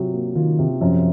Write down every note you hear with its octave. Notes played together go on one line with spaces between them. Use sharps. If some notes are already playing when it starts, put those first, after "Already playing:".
Already playing: C3 F#3 F4
A#3
D#3 F4
C3
F#2 F3